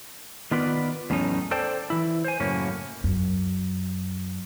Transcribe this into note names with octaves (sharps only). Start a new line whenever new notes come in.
D#3 B3 F4 B4 D5
E2 A2 F#3 C#4 D#4
A4 C5 D5 G5 A5
E3 E4
C5 G#5
F#2 A2 C#3 A#3 C#4
F#2